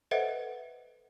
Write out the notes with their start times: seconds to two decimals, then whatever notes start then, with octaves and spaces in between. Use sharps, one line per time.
0.11 A4 B4 C5 D#5 E5 F#5